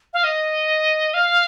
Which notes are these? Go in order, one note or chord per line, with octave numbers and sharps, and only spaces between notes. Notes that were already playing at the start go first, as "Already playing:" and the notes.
F5
D#5
F5